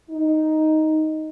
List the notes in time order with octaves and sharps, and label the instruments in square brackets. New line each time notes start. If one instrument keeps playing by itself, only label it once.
[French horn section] D#4